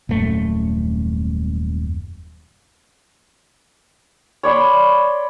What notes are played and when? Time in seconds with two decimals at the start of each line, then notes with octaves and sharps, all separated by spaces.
0.09 D#1 F#2 A3
4.43 C#5 D5 B5 C6